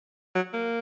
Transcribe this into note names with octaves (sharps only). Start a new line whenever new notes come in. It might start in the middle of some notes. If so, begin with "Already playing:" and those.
F#3
A#3